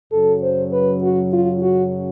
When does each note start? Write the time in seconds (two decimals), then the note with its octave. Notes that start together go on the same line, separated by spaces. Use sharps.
0.12 F#2 C#3 F#3 A4
0.42 C5
0.72 B4
1.02 F#4
1.32 F4
1.62 F#4